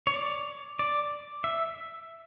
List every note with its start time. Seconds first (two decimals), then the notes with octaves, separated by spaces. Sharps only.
0.07 C#5
0.14 D5
0.79 D5
1.44 E5